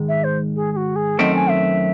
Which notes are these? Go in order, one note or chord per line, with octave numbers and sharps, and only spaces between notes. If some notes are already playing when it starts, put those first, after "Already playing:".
Already playing: G#2 D#3 G#3
E5
C5
G#4
G#4
F#4
G#4
F#2 D#3 A3 C4 D#5
G#5
E5